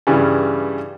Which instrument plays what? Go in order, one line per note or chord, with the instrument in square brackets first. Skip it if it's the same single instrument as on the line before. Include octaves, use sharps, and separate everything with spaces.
[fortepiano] G2 C#3 E3 G3